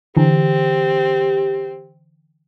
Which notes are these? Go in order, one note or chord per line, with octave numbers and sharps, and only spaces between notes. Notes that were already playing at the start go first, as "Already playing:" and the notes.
D3 E3 C4 G4